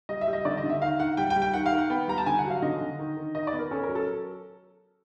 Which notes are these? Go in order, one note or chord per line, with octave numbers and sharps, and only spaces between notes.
G3 D#5
E5
G3
D#5
D3 D5
D#5
D3
E5
D#3 F5
D#3 F#5
G3 G5
G5
G3
G5
D#3 F#5
F5
D#3
F#5
B3 G5
G3 A#5
A5
D3 G#5
F#5
F#3
F5
D3 D#5
D3
D#3
D#3
D#3 D#5
D5
B3
A#4
C#4 A4
A#4
F#3
A4